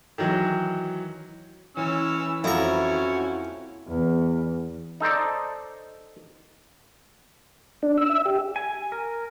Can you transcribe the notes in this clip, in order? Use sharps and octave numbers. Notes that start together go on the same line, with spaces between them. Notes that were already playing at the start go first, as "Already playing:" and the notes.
D#3 E3 F#3
E3 C#4 E6
F2 C#4 E4 F#4 A#5
E2
D#4 A4 C5 D5
D4
E6
E5
G4
G#5
A#4